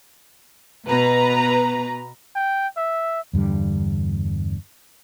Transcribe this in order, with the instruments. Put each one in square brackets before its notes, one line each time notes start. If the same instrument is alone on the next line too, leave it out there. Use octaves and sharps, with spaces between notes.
[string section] B2 B4 A#5
[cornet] G5
E5
[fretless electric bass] E2 G2 D3 G3